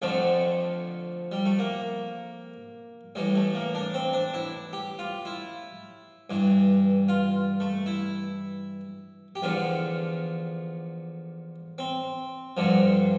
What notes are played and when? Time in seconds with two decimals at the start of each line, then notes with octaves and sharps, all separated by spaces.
0.02 F2 D3 F3 A3
1.32 G3
1.45 A3
1.59 A#3
3.15 A2 E3 G3
3.36 A3
3.55 A#3
3.75 D4
3.94 C4
4.13 D4
4.34 E4
4.73 G4
4.99 F4
5.25 E4
6.30 G2 E3
7.08 F4
7.60 A3
7.86 E4
9.35 G4
9.43 E2 D3 F3 F4
11.78 C4
12.57 G2 D3 F3